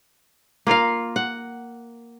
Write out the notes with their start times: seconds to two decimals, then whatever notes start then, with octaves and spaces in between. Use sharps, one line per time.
0.67 A#3 F4 A#4 F5
1.16 F#5